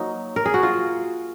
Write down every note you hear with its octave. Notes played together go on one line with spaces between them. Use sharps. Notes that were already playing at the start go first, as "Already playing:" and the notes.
Already playing: F#3 A#3 D#4
A#4
G#4
F#4
F4